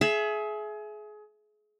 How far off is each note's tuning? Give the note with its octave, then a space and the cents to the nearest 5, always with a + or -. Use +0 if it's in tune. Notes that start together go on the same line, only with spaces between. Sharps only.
G#4 +30 E5 +10